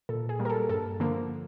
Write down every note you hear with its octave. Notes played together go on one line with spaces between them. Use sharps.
A#2 A4
G#4
G3 A#3
A#4
A4
G2 A4
D3 F3 A#3